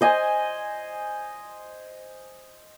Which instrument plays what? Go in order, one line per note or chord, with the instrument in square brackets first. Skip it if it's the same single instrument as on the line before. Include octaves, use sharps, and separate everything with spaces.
[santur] C5 D#5 G#5